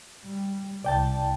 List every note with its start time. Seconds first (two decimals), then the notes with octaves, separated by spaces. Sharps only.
0.25 G3
0.84 C2 D5 G5 A5